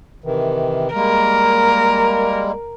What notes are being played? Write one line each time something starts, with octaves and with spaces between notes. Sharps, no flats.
C3 D#3 E3
G3 G#3 A#3 A#4